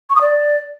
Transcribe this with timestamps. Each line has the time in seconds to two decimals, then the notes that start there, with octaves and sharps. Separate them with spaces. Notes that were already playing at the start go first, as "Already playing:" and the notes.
0.10 C#6
0.15 D#6
0.21 D5